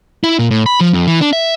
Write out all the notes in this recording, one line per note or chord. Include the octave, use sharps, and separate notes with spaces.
E4
A#2
A2
B5
F3
F2
E3
D4
E5